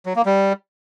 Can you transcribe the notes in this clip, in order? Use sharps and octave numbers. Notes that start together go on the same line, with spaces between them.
F#3
A#3
G3